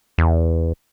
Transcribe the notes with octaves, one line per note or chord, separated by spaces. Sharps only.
E2